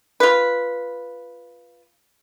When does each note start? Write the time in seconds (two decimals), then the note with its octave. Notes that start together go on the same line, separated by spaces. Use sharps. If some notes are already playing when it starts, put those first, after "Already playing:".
0.20 F4 B4